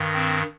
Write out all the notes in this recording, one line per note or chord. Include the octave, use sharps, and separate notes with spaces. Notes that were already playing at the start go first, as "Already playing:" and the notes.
Already playing: G2 D#3
C4